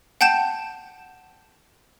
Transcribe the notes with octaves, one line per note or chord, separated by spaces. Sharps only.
F#5 G5 A5 G6 E7